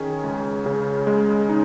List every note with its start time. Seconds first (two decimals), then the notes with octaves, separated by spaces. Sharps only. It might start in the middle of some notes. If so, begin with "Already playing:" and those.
Already playing: D#3 C#4 G#4
0.23 C#2
0.66 C#3
1.07 G#3
1.49 D#4